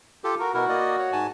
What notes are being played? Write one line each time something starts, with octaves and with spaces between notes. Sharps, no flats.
F4 G4 A4
F#4 A#4
B2 E4 F#4 A#4
A#3 D5 D#5
C#5
G#2 G#5 A5